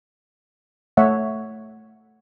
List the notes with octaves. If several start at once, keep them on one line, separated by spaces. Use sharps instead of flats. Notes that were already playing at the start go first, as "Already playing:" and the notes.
A3 C#5 E5 F#5